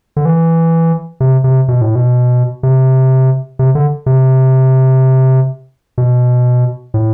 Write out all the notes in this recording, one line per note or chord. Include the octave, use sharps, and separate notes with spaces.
D3
E3
C3
C3
B2
A2
B2
C3
C3
D3
C3
B2
A2